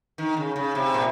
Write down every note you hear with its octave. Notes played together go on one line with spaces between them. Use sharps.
D#3
C#3
C#3
C3
A#2